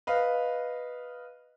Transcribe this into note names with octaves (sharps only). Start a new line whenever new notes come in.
B4 D#5 F5